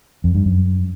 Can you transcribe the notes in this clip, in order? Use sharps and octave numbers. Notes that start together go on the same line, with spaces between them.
F2
G2
F#2